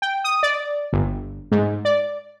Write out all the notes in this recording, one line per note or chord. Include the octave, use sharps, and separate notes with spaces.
G5
D#6
D5
G1
G#2
D5